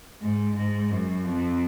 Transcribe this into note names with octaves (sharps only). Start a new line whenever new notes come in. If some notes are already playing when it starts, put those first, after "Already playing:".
G#2
G#2
F#2
F2